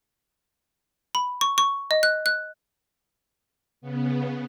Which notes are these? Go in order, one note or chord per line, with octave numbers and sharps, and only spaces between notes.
B5
C#6
C#6
D#5
F#6
F#6
C#3 B3